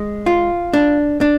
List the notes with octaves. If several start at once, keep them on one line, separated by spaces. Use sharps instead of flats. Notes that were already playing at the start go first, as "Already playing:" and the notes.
Already playing: G#3
F4
D4
D4